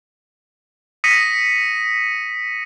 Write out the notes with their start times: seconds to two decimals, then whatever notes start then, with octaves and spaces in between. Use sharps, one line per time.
1.04 D#6 A#6 B6 C#7 D#7